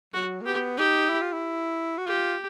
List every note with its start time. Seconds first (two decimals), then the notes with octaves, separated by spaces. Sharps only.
0.14 F#3 F#4
0.42 A#3
0.46 B3 G4
0.78 D#4 G4
1.10 E4
1.21 F4
1.32 E4
1.98 F#4
2.06 F4 G4